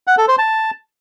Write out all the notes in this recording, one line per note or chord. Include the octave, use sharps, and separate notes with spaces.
F#5
A4
C5
A5